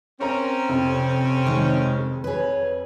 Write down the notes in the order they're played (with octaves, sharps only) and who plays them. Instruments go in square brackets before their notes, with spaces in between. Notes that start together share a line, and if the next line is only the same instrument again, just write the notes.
[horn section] C4 C#4 [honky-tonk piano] A#4 A#5
[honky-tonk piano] F2 [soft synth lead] C3
[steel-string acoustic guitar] D#3 G#3
[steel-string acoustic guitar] G#4 B4 [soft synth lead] C#5